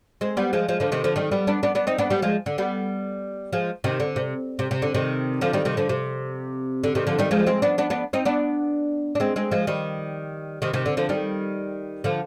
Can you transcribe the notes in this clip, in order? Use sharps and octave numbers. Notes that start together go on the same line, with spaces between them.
G#3 C4
G3 B3
F3 G#3
F3 G#3
D3 F3
C3 D#3
D3 F3
D#3 G3
G3 B3
B3 D4
B3 D4
B3 D4
C4 D#4
B3 D4
G3 B3
F3 G#3
D3
G3 B3
F3 G#3
C3 D#3
D3
C3
C3
C3
D3
C3 D#3
D3 F3
D#3 G3
C3 D#3
D3 F3
C3
D3
C3 D#3
D3 F3
D#3 G3
F3 G#3
G#3 C4
B3 D4
B3 D4
B3 D4
C4 D#4
B3 D4
D4
G#3 C4
G#3 C4
F3 G#3
D#3 G3
C3 D#3
C3 D#3
D3
D3 F3
D#3 G3
D3 F3